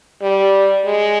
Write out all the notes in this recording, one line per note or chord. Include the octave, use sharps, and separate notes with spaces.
G3
G#3